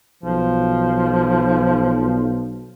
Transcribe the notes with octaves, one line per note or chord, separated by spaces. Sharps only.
B1 F3